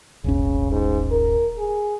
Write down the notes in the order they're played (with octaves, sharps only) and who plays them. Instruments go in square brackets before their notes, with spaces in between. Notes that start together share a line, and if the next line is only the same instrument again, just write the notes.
[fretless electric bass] D#1 G#1 C#4 [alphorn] C#3
[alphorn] G#2
A#4
G#4